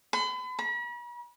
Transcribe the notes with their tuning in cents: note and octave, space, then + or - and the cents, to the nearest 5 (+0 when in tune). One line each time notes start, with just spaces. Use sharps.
B5 +40
B5 -45